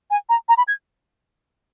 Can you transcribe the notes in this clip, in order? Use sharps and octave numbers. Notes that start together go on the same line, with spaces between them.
G#5
A#5
A#5
B5
G#6